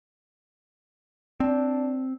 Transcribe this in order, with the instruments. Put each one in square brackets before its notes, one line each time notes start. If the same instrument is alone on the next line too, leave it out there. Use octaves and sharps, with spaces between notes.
[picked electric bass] C4 [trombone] D4